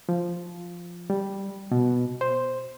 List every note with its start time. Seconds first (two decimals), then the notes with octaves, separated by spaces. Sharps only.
0.09 F3
1.10 G3
1.72 B2
2.21 C5